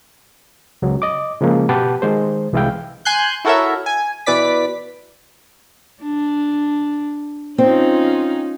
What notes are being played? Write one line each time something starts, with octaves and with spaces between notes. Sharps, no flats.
C#2 F#3
D#5 D6
C#3 F3 G#3 A#3
B2 G4 B4 F#5 A5
D#3 G#3 C5
C2 E3 G#3 E4 F5 G5
G#5 C6 F#6 G6
E4 F#4 A4 A#4 C#5 E5
G#5
B2 E3 B4 D5 D6 B6
D4
C4 C#4 D#4 F4